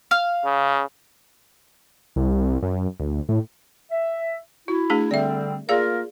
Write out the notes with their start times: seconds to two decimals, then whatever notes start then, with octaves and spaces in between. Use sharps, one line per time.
0.11 F5 F6
0.45 C#3
2.16 C2
2.63 F#2
3.00 D2
3.29 A2
3.91 E5
4.68 E4 F#4
4.90 A3 D4 G#4
5.11 D3 G3 C4 D5 E5
5.69 A#3 F4 G#4 A#4 D5 F5